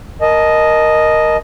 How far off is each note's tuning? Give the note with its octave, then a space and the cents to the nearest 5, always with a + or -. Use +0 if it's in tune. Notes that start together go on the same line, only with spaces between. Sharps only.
A#4 +0 D#5 +0 A5 -30